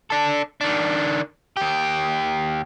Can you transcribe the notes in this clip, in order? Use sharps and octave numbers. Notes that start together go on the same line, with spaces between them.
D4 A4
D#3 D4
D#2 G4